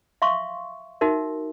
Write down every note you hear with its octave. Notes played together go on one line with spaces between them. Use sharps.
E5 F5 C6 C#6
D#4 F#4 A#4 E5